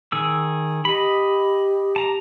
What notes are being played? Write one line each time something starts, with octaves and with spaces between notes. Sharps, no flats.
D#3 G#4 E6
G4 D#5 B5
A5 A#5